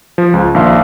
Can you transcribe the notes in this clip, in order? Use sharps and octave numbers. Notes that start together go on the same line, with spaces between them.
F3
C#2
A#1 D#3 F5 C6